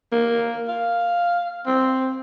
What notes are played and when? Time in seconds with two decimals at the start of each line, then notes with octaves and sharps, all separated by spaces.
0.12 A#3
0.68 F5
1.66 C4